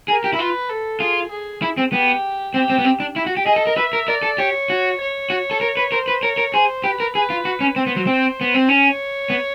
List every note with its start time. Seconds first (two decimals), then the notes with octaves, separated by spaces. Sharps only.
0.08 G#4 A#4
0.24 G4
0.33 E4
0.39 F4 B4
0.70 A4
1.00 F4 G#4
1.31 G#4
1.62 E4
1.77 C4
1.92 B3 G4
2.54 C4 G4
2.70 C4
2.78 B3
2.84 C4
3.00 D4
3.16 E4
3.26 F#4
3.37 G4
3.46 G#4 D#5
3.56 A4
3.67 A#4
3.76 B4 E5
3.93 A#4
4.08 A#4 D5
4.23 A4
4.38 G4 C#5
4.70 F#4
5.00 C#5
5.30 F#4
5.51 A4
5.61 A#4
5.77 B4
5.92 A#4 C5
6.08 B4
6.22 A#4 C#5
6.38 A#4
6.54 G#4 C5
6.84 G4 B4
7.00 A#4
7.15 G#4 B4
7.30 F4
7.45 F#4
7.61 C#4
7.76 C4 C5
7.87 B3
7.96 F#3
8.07 C4
8.41 B3
8.54 C4
8.68 C#4 C#5
9.30 B3